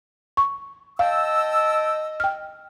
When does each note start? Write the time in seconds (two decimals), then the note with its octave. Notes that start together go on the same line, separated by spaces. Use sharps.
0.37 C#6
0.99 D#5 F5 G5 A5 E6
2.20 G5 F6